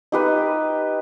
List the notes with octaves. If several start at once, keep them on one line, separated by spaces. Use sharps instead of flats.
D#4 G4 B4